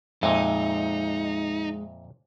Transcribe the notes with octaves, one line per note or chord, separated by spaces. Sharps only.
F2 A#2 G#3 D#4 E5